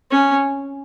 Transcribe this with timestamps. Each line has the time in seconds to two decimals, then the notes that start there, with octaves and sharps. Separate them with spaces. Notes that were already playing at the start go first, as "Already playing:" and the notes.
0.11 C#4